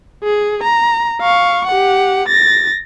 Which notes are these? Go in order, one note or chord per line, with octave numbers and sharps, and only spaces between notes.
G#4
A#5
F5 C#6
G4 F#5
A6 A#6